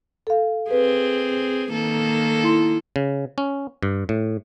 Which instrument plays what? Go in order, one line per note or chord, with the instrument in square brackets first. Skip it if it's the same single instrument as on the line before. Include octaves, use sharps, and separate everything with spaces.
[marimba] A4 F5
[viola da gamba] C4 G#4 [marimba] B4
[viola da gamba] D#3 A#3 A4
[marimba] E4 C6
[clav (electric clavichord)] C#3
C#4
G2
A2